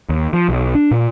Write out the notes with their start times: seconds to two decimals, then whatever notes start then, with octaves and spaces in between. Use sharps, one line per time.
0.09 D#2
0.33 F3
0.49 B1
0.75 D4
0.91 A#2